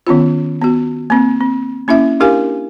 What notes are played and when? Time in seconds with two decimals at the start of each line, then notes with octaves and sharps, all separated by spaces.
0.07 D#3 B3 C#4 F4
0.61 B3 F#4
1.10 A#3 C4
1.40 C4
1.88 A#3 C#4 E4 E5
2.20 D4 E4 G4 A#4 F5 G#5